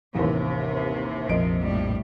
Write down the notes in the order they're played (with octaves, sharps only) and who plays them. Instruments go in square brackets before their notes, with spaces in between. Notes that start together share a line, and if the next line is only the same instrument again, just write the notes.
[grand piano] A1 D#2 [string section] C3
[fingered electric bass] A#1 F2 [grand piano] A#2 D#5 D7 [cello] F3
[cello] A2 G3